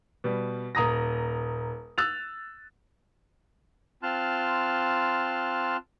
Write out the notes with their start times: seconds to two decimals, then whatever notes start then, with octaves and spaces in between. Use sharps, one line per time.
0.24 B2 G3
0.75 D#1 A#5 D#6 A#6
1.98 E6 F#6 A6 F7
4.03 C4 F4 A5 C6 F6 F#6